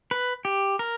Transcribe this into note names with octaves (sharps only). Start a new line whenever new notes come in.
B4
G4
A#4